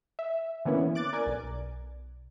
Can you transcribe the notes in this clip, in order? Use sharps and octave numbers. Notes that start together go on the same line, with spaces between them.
E5
D3 E3 A#3 B3 C#4 E4
D6 F#6 A6 D7
A#4 D5 G#5
B1